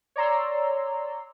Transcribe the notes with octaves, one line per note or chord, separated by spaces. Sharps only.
C#5 D5 A#5 C6 E6